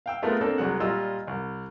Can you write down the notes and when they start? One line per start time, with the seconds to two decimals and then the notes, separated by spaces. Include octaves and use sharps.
0.06 F5 G5 E6
0.22 G#3 A3 B3 F4 A#4
0.41 A#3 C4 D4 A4
0.58 C2 F#3 G#3 F#5
0.80 A#2 G3 F4 D#5 E6
1.27 C2